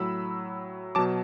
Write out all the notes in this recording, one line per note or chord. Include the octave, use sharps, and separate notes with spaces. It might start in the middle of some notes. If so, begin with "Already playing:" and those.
Already playing: A2 F#3 B5 E6
B2 F#3 A5 D6